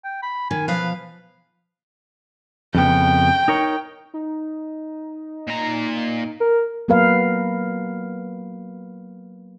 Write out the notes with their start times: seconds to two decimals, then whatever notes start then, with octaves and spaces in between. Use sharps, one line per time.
0.04 G5
0.23 B5
0.51 D#3 G#5
0.68 B2 F3 B4 F5
2.75 F2 C#3 B3 G5
3.48 D#4 A#4 C#5
4.14 D#4
5.48 A#2 A#5
6.41 A#4
6.88 F#3 A#3 B3 A#4 B4 F5